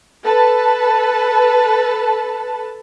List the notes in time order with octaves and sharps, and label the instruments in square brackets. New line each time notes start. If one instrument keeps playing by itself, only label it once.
[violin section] A4 B4 A5